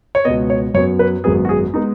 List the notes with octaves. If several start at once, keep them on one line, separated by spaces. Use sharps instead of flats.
C#5
C#2 B2 B3 D#5
C#5
F#2 F#3 B3 C#5
B4
G#1 F#2 F#3 B3 G#4
F#4
G#4
G#3 B3 D#4